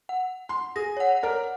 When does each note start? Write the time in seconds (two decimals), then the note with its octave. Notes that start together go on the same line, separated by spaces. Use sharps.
0.09 F#5
0.49 C6
0.76 G#4 A#6
0.97 C#5 F#5
1.23 A#4 D5